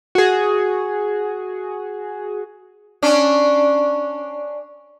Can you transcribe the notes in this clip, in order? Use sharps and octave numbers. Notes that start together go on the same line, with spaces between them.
F#4 G#4
C#4 D4